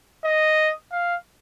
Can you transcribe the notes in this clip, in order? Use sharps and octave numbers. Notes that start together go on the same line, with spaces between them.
D#5
F5